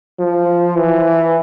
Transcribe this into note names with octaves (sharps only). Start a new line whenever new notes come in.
F3
E3